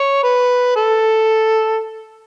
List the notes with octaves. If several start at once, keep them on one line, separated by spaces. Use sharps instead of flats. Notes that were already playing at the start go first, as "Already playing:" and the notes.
Already playing: C#5
B4
A4